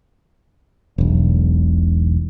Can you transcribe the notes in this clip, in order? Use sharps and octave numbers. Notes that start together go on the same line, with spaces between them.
E1 B1